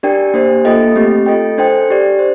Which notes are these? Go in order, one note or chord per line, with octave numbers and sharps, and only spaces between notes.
D4 G4 A#4 D5 G5
A#3 D4 G4 C5
A#3 F4 A4 D#5 G5
A3 C4 G4
F4 A4 D#5 G5
D4 A4 C5 G5
D4 G4 D5
C5